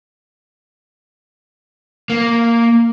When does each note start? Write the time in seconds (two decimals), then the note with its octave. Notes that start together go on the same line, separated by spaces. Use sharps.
2.10 A#3